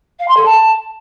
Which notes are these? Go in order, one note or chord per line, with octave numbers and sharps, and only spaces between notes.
F5
C6
A4
A5